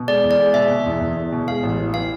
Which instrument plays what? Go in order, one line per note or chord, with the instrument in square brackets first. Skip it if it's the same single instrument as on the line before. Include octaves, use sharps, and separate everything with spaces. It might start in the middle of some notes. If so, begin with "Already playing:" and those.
Already playing: [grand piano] B2
[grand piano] G#3 [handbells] D5
[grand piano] E2
[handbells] D5
[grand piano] G#3
[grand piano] B2 [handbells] E5
[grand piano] B2
E2
E2
E2
B2
[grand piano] G#3 [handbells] F5
[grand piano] A1
E3
[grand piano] E3 [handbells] F5